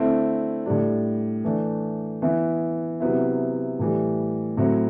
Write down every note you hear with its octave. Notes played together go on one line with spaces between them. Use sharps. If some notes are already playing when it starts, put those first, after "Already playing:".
Already playing: D3 A3 C4 E4
A2 G3 D4
E3 A3 D4
E3 B3 E4
C3 F#3 B3 E4
A2 E3 G3
A2 F#3 C4 E4